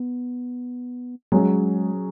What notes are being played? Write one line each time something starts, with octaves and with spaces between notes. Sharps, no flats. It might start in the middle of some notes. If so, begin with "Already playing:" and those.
Already playing: B3
F#3 G#3 C#4 G#4